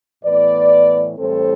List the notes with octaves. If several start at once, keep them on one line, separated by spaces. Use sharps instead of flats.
A2 E3 B3 B4 D5
A2 E3 G3 C4 A4 C5